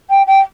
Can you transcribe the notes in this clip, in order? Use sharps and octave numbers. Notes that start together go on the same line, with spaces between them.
G5
G5